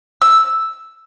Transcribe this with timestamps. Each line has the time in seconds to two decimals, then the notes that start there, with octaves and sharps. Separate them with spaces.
0.22 E6